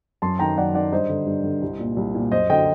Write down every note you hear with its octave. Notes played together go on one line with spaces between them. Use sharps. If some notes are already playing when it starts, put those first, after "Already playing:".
F#2 A5 C6
D#3 G5 A#5
F#2 D5 F#5
D#3 D5 F#5
G2 C5 D#5
D3
G2
D3
C2
A#2
C2
A#2
F#2 C5 D#5
D3 D#5 G5